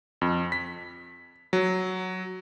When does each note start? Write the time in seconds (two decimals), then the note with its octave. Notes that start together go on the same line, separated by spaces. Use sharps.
0.21 F2
0.52 B6
1.53 F#3